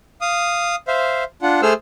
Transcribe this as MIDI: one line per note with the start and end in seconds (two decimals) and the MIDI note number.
0.21 0.76 77
0.21 0.76 87
0.88 1.24 72
0.88 1.24 76
0.88 1.24 77
1.42 1.61 62
1.42 1.61 65
1.42 1.61 78
1.62 1.73 57
1.62 1.73 68
1.62 1.73 69
1.62 1.73 72
1.62 1.73 88
1.62 1.73 89